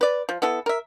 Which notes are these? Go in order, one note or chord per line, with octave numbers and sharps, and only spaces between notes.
B4 D5
F3
B3 E4 A4
A#4 E5